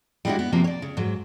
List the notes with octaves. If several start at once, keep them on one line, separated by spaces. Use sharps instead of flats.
G3 G#3 B3 D4 E4 F#4
B3
C3 F3 A#3 C4 G4
C#5 D5
C#3
G#2 F#3